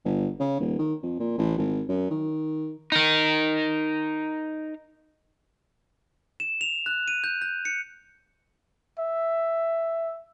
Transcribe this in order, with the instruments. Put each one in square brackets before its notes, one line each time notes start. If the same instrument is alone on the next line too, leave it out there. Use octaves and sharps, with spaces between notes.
[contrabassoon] G1
C#3
D#1
D#3
F2
A#2
A1
G#1
F#2
D#3
[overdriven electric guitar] D#4 A#4
[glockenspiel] E7
F7
F#6
D#7
G6
G6
C#7
[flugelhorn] E5